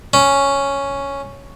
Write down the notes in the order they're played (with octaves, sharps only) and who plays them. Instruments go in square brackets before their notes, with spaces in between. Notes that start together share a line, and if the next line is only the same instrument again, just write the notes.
[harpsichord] C#4